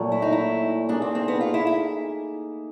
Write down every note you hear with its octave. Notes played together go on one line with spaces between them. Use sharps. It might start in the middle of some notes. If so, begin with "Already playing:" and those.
Already playing: A#2 F#3 A3
E4
D#4
E4
A#3 D4 D#4 G#4
C4
C4
B3
F4
E4
E4